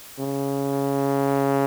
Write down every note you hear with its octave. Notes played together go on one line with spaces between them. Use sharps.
C#3